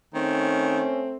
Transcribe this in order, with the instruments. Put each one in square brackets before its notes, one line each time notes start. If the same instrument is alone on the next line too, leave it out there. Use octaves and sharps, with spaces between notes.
[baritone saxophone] D#3 [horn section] A3 C4 [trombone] C#4